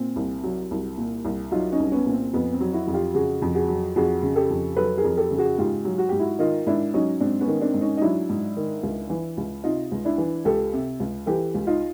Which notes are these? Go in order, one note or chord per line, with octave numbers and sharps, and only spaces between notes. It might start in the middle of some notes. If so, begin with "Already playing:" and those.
Already playing: A#2 C4
C2
F#3
C2
A#2
C2
F#3 D#4 F4
C#4 D#4
C2
B3 C#4
A#2
C4
F2 B3
C4
F#3
E4 F#4
F2
F4 G4
C#3 F#4 G#4
F2
F#4 G#4
F#3
F2 F#4 G#4
C#3
G4 A4
F2
F#3 A4 B4
G#4 A#4
F2
G4 A4
C#3
F#4 G#4
G#2 F4 G4
F#3
F#4
G#2 G4
E4 F#4
D#3 D#4 F4
G#2 D4 E4
F#3 C#4 D#4
G#2 C4 D4
B3 C#4
D#3
C4 D4
G#2
C#4 D#4
D#4
F#3 D4 E4
G#2
D#3
C#2
E3
C#2
C3 D#4 F4
C#2
D4 E4
E3
C#2 G4 A4
C3
C#2
E3 G4 A4
C#2
D#4 F4